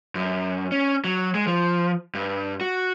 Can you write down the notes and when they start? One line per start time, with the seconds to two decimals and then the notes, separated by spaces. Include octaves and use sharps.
0.15 F#2
0.72 C#4
1.04 F#3
1.35 G#3
1.47 F3
2.15 G2
2.61 F#4